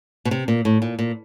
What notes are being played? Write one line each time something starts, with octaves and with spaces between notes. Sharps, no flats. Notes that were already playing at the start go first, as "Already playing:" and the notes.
B2
C3
A#2
A2
A#2
A#2